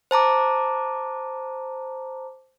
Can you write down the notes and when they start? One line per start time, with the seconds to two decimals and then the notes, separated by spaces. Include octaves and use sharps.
0.11 C5 A5 A#5 D6